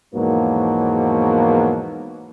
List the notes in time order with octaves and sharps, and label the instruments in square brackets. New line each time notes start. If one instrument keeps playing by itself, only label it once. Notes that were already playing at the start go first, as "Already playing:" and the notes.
[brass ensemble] E2 G#2 B2 F3 F#3 A#3